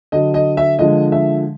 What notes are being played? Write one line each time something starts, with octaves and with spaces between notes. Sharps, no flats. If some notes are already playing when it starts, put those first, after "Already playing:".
D3 F#3 D#5
D#5
E5
D3 F3 G#3 D#5
E5